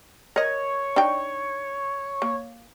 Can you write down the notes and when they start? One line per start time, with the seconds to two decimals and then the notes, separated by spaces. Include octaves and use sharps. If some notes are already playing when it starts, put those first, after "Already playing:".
0.36 A#4 C#5 D#5
0.96 D4 D#4 G5
2.22 A#3